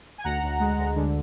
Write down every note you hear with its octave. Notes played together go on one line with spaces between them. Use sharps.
G#5
D2 F#5 A#5
D2
G#3
D2
D3